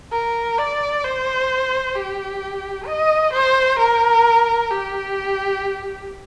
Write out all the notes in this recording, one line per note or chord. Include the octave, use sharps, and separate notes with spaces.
A#4
D5
C5
G4
D#5
C5
A#4
G4